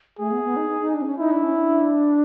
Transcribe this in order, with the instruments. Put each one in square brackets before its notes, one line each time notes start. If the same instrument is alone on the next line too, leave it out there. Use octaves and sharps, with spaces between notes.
[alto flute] A3 [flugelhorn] G#4
[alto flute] B3
B3
D#4
D#4
D#4
D4
C4
C#4
[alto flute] D#4 [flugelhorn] E4
[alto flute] D4
C#4
D4